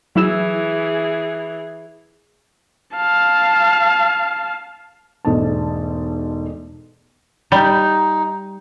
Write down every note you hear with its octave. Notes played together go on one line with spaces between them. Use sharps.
E3 F#3 E4 G#4 E6
F5 A5
E1 G#2 B2 A3 D#5 A5
G3 D#4